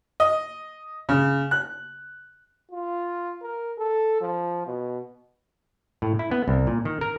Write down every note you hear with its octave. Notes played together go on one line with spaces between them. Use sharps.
D#5
C#3
F#6
F4
A#4
A4
F3
B2
A2
E4
B3
C2
A#2
D#3
A#4